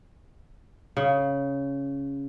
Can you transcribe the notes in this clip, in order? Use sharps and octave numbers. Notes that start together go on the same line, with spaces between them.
C#3